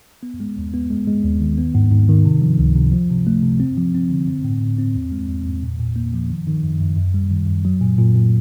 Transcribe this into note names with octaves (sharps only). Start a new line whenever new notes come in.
B3
G#3
D#2
B3
G#3
G#3
D#2
D#3
B3
G#2
G#2
D#3
C3
F3
C#2
C3
F3
C3
A3
C3
C4
F3
C4
D3
C4
A2
A2
C4
E2
G#3
E2
E2
A#2
A#2
A#3
F3
D#3
D#3
F#2
F#2
F#2
G3
D#3
F#2
F#3
A#2
A#2
A#2